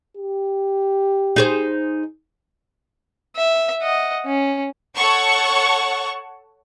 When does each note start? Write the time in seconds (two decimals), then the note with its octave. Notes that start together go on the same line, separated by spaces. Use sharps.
0.17 G4
1.36 D#4 G#4 C5
3.36 E5
3.82 D#5 F#5
4.25 C#4
4.96 A4 C#5 F#5 A5 C#6